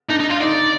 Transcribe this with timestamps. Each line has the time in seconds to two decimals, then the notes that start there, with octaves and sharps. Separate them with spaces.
0.09 D4 D#4
0.20 D#4
0.30 F4
0.41 D#4 D5